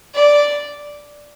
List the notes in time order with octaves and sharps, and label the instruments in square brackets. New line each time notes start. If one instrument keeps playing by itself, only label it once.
[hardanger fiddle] D5